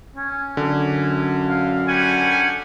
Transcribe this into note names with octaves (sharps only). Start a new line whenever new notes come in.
C#4
F#2 D3
F5
G3 C#4 F#5 G#5